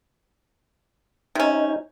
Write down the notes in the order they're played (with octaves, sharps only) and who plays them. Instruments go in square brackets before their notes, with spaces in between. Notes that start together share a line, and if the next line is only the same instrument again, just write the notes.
[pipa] C3 C#4 [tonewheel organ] D#4